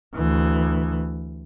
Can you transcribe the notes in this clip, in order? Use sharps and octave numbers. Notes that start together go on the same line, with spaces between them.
D2 E3